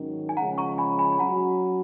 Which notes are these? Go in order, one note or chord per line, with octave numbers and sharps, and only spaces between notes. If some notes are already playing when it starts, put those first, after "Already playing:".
Already playing: G#2 D#3 F#3 C#4
G#5
C#3 F3 G#3 C#4 F#5 A#5
A#5 C#6
G#5 B5
G#5 B5
G#5
F#3 C#4 F#4 F#5 A#5